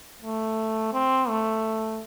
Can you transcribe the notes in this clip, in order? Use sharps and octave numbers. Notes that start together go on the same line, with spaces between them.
A3
C4
A3